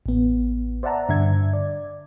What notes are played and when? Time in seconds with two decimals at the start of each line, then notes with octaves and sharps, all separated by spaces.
0.06 A1 B3
0.83 C5 D5 E5 F#5 A5 A#5
1.09 G2 D3 E5 G#6
1.53 D5